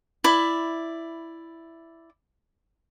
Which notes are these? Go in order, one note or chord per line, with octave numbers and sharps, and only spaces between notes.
E4 D5 B5